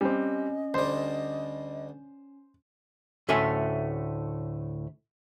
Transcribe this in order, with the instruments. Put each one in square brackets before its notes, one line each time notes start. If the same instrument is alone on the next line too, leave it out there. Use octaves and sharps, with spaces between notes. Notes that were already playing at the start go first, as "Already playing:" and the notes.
[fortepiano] G3 C4 [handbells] C#4 [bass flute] D#5
[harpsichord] D2 G3 [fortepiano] C5
[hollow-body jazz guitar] D2 A2 A3 C#4 E5 G#5